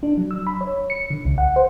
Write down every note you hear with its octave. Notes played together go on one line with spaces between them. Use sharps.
D4
F#3
E6
B5
C#5
C#7
D3
C#2
F#5
C5